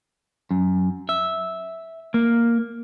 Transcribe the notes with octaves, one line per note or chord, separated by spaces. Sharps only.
F#2
E5
A#3